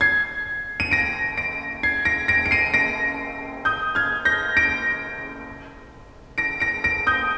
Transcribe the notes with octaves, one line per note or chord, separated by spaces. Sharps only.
G#6 C7
D#7
A#6 D7
A#6 D7
G#6 C7
A#6 D7
A#6 D7
D7
C7 D#7
A#6 D7
D#6 G6
F6 G#6
G6 A#6
A#6 D7
A#6 D7
A#6 D7
A#6 D7
D#6 G6